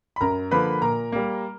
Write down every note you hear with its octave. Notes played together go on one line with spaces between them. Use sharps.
B5
F#2 A#4 A#5
D3 F3 A#3 B4 B5
A#2 A#4 A#5
G3 A#3